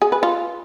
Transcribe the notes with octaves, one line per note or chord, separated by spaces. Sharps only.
G#4
B4
F4